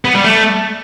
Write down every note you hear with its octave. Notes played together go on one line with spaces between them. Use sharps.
B3
G3
A3